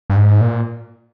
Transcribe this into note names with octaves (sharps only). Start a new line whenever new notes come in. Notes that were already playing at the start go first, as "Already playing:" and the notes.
G2
G#2
A#2